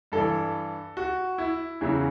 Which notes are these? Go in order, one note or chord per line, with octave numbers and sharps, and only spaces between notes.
G2 E3 A4
F#4
E4
E2 C#3 F#3 E4